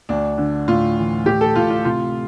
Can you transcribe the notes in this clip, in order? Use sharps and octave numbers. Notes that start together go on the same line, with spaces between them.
D2 D4
D3
A2 F4
E3
A2 G4
A4
A2 F4
F4
C3 F4